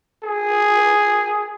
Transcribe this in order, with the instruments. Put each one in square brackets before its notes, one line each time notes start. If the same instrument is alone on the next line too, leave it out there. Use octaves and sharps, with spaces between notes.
[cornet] G#4